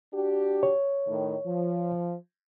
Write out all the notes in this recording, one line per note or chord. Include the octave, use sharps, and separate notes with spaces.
D4 F#4 G4
C#5
A2 D#3
F3